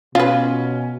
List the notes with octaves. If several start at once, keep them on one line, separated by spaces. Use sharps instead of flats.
B2 C#4 F4 B4